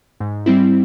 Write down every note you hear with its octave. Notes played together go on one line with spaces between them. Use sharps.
G#2
G3 C4 E4